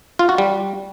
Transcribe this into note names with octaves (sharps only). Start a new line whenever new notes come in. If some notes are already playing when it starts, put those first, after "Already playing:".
F4
F#4
G3